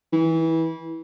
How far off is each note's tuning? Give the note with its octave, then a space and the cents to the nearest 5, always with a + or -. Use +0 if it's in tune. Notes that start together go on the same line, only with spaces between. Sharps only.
E3 -20